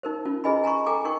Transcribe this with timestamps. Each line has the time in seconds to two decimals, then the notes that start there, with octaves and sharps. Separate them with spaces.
0.03 D#4 A#4 C5
0.25 C#4 F4
0.44 E4 G#4 B4 D#5 G#5 B5
0.64 G#5 A#5 B5 C#6
0.86 A4 G5 G#5 A#5 D6
1.05 D#4 A#4 G5 C#6